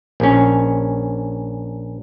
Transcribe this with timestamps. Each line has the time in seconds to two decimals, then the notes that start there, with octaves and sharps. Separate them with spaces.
0.20 A#1 C#4